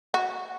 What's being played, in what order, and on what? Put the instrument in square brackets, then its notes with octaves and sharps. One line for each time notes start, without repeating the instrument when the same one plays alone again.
[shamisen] F#4